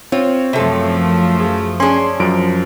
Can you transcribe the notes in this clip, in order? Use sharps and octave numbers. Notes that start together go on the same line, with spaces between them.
C4 F4 C#5
F#2 C3 F3 A3 A4
G#4
C#4 D4 G#4 C6
F#2 F3 D7